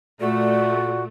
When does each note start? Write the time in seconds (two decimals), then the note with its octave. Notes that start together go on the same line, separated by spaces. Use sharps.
0.20 A#2 A3 F#4 D5